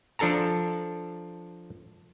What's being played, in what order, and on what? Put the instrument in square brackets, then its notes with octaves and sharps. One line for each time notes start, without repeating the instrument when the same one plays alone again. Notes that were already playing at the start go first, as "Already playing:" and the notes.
[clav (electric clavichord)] F3 D4 A4 A5 A#5